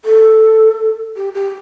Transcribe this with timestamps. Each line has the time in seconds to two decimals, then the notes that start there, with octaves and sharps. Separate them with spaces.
0.05 A4
1.16 G4
1.34 G4